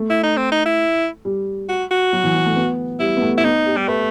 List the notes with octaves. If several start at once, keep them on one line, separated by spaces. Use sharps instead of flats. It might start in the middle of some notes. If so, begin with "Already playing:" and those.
Already playing: A3
E4
D#4
C4
D#4
E4
G3
F#4
F#4
F#3
E3
F#3
A3
B3
G3 E4
B3
A3
E4
B3 D#4
G4
G3
A3 B4